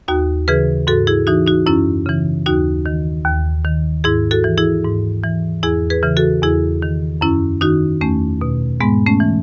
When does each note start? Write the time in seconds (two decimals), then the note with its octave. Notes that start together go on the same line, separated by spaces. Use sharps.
0.08 D#2 D#4 F#4
0.48 C#3 E3 G#4 B4
0.87 G#2 F#4 A4
1.07 E4 G#4
1.27 E3 D#4 F#4
1.46 D#4 F#4
1.66 F#2 C#4 E4
2.06 C#3 E3
2.46 D#2 D#4 F#4
2.86 D#3
3.25 D#2
3.65 D#3
4.04 G#2 E4 G#4
4.31 F#4 A4
4.44 E3
4.58 E4 G#4
4.85 G#2
5.24 E3
5.63 E2 E4 G#4
5.90 G#4 B4
6.03 C#3 E3
6.17 F#4 A4
6.42 E2 E4 G#4
6.82 D#3
7.21 F#2 C#4 E4
7.61 D#3 D#4 F#4
8.01 E2 A3 C#4
8.41 B2
8.81 G#2 G#3 B3
9.06 A3 C#4
9.20 E3